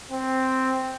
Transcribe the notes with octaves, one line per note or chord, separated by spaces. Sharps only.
C4